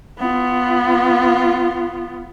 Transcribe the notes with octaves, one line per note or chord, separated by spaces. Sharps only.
B3 F4